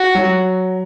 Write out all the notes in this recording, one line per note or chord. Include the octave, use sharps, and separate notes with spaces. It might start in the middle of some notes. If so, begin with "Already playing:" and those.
Already playing: F#4
F#3